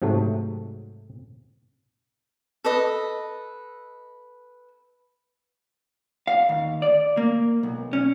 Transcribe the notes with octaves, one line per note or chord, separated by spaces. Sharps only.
G#2 C3 F#3 A3
A4 B4 D#5
F5
D#2
D5
A#3
B1
C#4